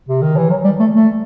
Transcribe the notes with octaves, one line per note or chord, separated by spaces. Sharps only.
C3
D#3
E3
F#3
G3
A3
A3